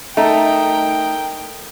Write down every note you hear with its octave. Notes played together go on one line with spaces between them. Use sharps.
A3 D#4 A#4 G5